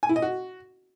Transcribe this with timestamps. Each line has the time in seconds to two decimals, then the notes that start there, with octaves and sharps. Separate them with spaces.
0.03 G#5
0.09 E4
0.16 D#5
0.22 F#4